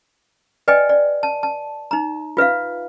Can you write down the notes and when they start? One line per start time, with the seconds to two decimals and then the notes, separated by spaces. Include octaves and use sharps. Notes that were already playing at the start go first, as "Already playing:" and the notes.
0.68 B4 D5 D#5 G5 G#5
0.89 D5
1.23 A5
1.43 A5
1.91 D#4 A#5
2.37 F4 B4 E5 F5